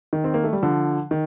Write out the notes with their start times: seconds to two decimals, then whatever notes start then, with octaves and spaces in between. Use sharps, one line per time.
0.13 D#3
0.24 C4
0.34 A#3
0.44 A3
0.53 G3
0.62 D3 F3
1.11 D#3